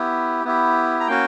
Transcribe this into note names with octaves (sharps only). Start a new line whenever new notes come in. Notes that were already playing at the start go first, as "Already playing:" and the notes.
Already playing: B3 E4 G4
B3 E4 G4
A#5
A#3 C#4 F#4 G5